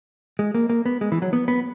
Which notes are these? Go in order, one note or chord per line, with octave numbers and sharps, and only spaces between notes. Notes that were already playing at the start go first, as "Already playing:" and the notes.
G#3
A#3
A#3
B3
G#3
E3
F#3
B3
B3